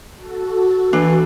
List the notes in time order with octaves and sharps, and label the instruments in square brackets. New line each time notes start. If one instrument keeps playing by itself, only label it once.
[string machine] F#4 A4
[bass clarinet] E3 [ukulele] D4